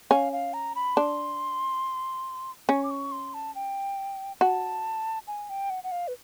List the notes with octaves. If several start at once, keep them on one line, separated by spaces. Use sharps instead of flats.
C#4 F5
F5
A#5
B5
D4 C6
C#4 C#6
D6
C#6
C6
A5
G5
F#4 A5
G#5
G5
F#5
F#5
F5
B4